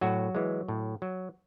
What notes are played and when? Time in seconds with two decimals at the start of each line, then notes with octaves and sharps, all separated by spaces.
0.01 A2 F#3 F#4
0.35 E3 G#3
0.68 A2
1.02 F#3